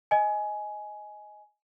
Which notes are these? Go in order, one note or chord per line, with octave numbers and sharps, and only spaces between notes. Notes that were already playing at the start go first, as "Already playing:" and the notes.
D#5 G#5